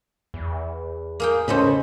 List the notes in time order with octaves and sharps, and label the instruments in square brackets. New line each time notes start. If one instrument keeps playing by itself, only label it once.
[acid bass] E2
[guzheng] A#3 G#4 G5
[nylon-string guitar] C#3 C5 [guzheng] A4 D#5 B5